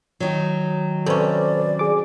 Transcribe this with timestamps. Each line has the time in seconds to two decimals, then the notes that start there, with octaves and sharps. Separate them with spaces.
0.20 D#3 F#3
1.06 C3 C#4 A4 B4 C5 D5
1.79 G#4 D6